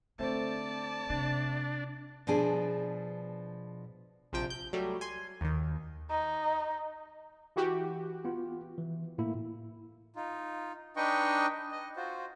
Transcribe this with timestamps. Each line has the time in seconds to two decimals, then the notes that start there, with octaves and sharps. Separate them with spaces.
0.19 D3 A3 C4 D5 A5
1.10 C3 D4
2.27 B2 F3 D4 G#4
4.32 A#1 C3 F3 G5
4.50 G6
4.73 F#3 G3 A3
5.01 G#5 C6
5.41 D#2 D#3
6.10 D#4
7.56 E3 F#4 G4
8.25 B3 F4
8.78 E3
9.18 A2 A#3 E4
10.16 D#4 F4
10.96 D4 D#4 B4 D#5 G5 C#6
11.72 D#5
11.96 F4 F#4 C5